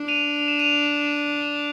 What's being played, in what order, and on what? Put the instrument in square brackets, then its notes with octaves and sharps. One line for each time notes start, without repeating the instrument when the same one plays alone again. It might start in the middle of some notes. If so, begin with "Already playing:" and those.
Already playing: [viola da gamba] D4
[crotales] D#7 F7
F7
E7
D#7 F7